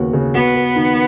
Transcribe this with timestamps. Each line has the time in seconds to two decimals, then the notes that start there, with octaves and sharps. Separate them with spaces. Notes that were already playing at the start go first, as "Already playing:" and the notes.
Already playing: D#2 C#3 B3 F#4
0.13 C#3
0.34 B3 F#4
0.54 B4
0.76 D#3